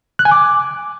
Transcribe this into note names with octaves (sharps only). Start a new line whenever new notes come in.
F#6
G#5
D6